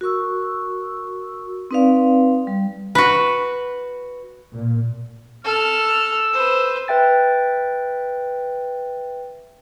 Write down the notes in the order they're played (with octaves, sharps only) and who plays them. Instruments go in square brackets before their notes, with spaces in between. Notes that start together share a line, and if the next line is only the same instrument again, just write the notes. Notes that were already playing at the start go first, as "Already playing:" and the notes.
[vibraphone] F#4 A#4 C#6 E6
C4 D#4 B4 D5 F5
G3
[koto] F#4 B4
[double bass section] A#2
[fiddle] A4 F6 [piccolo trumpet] E6
[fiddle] B4 C5
[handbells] B4 E5 G5 A6